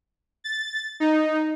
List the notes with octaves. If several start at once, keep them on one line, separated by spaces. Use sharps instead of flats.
A6
D#4